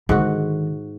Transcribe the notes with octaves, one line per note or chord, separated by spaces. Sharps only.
G#2 D3 D#3 F#4